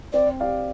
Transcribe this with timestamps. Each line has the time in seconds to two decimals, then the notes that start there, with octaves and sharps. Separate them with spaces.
0.13 C4 D5
0.40 G4 D5 F5